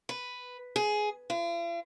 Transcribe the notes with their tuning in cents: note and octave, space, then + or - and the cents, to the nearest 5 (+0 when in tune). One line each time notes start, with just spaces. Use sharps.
B4 +5
G#4 +15
F4 -45